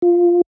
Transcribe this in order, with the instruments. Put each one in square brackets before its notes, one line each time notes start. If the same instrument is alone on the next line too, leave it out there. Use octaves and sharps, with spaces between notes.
[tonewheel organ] F4